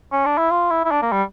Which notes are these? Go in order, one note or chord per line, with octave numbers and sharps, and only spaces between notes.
C#4
D4
E4
F4
E4
E4
D4
A#3
G3